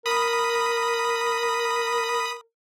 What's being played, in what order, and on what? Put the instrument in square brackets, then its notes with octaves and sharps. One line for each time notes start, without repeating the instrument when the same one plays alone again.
[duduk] A#4 [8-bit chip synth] B5 D#6